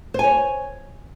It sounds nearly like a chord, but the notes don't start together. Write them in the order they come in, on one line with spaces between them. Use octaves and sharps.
C5 G#5 C#5